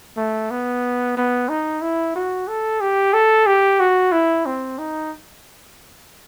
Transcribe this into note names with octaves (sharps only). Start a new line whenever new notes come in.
A3
B3
B3
D#4
E4
F#4
A4
G4
A4
G4
F#4
E4
C4
D#4